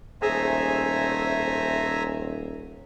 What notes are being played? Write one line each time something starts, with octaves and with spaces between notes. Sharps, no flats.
D#1 A3 G#4 C5 E5 G#5 A#5